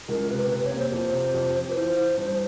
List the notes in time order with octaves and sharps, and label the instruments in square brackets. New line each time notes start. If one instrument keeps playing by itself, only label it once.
[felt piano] C#2 [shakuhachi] A#4
[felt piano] C3 [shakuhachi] B4
[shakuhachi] A#4
[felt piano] C3 [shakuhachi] B4
[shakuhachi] C#5
[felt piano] A#3
[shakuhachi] C5
[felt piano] F2 [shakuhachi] C5
[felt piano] C3
F2
F3
[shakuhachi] B4
[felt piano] E3 [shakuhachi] C5
[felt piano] E3
G2